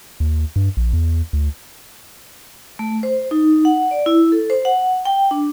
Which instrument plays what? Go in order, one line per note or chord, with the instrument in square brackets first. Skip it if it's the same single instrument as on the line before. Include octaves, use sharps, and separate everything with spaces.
[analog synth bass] D#2
G2
A#1
E2
D2
[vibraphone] A3
C5
D#4
F#5
D5
E4
A4
C5
F#5
G5
D4